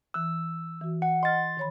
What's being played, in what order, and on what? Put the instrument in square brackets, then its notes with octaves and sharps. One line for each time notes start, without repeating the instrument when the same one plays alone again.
[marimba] E3 F#6 [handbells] E6
[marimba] E3 F#4
[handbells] F#5
[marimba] D#5 F6 [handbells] C6 A6
[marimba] D#3 C#5 B5